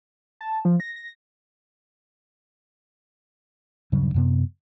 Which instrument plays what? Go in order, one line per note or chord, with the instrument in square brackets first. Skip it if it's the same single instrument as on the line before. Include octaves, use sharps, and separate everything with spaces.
[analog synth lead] A5
F3
A#6
A#6
[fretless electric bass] D#1 G2 C#3 F#3
F#2 C3 B3